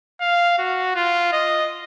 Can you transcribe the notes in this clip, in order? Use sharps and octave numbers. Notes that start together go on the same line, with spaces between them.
F5
F#4
F4
D#5